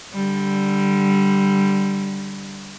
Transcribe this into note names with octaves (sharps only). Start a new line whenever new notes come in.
D3 G3